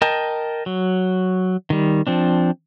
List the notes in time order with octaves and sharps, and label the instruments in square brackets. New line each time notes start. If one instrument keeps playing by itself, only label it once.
[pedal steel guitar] A#4 D#5 G5 A5
F#3
D#3 G3
F3 C4 D4